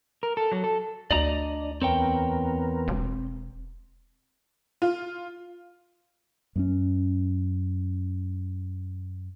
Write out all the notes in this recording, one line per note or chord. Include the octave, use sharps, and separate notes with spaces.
A#4
A4
F#3
A4
D2 D4 D5 D#5 A#5
E2 B3 C4 A#4 C#5 G5
E1
F4
F#2 B3 C#4